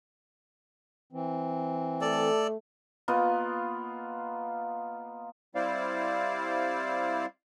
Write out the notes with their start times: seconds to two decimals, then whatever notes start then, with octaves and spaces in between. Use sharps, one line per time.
1.13 E3 C4
2.01 A3 A4 D5
3.08 A#3 B3 F4 D#5
5.55 G3 C4 E4 C5 D5 F5